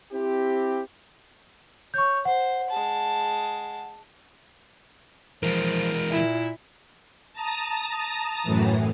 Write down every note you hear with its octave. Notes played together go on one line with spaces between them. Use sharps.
C4 E4 G4
C#5 C#6 G6
C5 F#5
G#3 A5
E3 F3 G#3 A#4
A#2 E4
A5 A#5 D#6
F#2 A2 E3